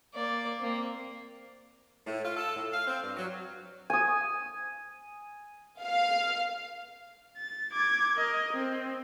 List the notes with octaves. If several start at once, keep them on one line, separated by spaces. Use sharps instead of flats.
A#3 D5
A#3 C4
A2
F4
A4
A2
F5
C4
G2
F#3
G#5 D#6
F5
A6
D6 G#6
A#4 D#5
C4